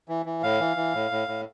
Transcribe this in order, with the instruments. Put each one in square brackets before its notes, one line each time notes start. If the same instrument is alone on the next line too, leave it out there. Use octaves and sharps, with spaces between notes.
[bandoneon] E3
E3
A2 F5
E3
E3
A2
A2
A2